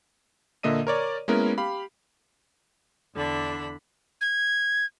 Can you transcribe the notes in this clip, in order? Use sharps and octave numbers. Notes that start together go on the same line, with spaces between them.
A#2 D3 A#3 D#5 E5 D#7
A#4 C#5 D5
G#3 A#3 B3 C#4 E4 A#4
G4 F5 B5
E2 D3 D4 B5
G#6